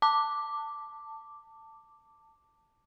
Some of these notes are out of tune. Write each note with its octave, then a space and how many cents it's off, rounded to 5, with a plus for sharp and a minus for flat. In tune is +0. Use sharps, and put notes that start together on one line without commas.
A5 +15 D6 +0